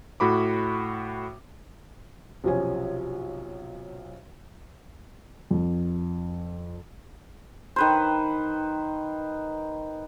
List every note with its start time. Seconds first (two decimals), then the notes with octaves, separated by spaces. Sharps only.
0.20 A2 F#4 B5 D6
2.44 B1 C3 F3 C#4 G#5
5.51 F2
7.76 D#3 B4 C5